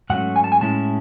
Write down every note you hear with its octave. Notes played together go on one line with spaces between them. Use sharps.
G#2 F#3 A3 C#4 F#5
G#5
A5
G#5
A2 G#3 C#4 E4 A5